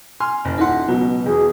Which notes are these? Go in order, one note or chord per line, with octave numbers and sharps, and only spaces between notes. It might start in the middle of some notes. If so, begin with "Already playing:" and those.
G#5 C6 F6
F#1
D#1 D#4 E4 F#5 C6
C#2 B2 F#3 B3
E2 B2 G#4